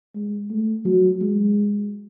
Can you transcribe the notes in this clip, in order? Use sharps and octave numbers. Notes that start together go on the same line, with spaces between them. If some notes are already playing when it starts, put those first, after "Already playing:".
G#3
A3
F#3
G#3